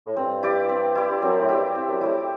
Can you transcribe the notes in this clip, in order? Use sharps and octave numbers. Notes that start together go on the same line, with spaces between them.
A2
G2 C4
E4 G4 D5
C4
E4 G4 D5
G2
F#2 C4
A2
E4 G4 D5
G2
C4
F#2
A2 E4 G4 D5